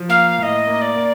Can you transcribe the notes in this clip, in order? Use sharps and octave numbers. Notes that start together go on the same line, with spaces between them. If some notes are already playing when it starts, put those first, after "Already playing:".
Already playing: F3
A#3 F5
A2 D#5 F5
A#3
D5
A#3